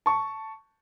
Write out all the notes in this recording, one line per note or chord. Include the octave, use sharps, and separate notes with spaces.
A5 C#6